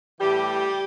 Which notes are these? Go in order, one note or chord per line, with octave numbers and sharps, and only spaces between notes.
A2 E3 G3 G4